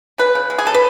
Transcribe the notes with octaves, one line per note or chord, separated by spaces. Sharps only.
C#3 B4
C#3
G#3
G#4
C#3 A4
B4